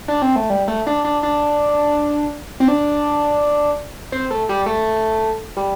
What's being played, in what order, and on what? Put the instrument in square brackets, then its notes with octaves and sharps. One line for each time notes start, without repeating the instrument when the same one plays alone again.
[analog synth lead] D4
C4
A3
G3
A3
D4
D4
D4
C4
D4
C4
A3
G3
A3
G3